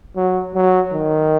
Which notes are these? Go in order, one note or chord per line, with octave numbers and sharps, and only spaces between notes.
F#3
F#3
D#3